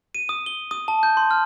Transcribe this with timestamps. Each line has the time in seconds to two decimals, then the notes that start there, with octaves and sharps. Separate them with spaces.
0.15 D#7
0.29 D#6
0.46 G7
0.71 D#6
0.88 A5
1.03 G6
1.17 C6
1.31 F6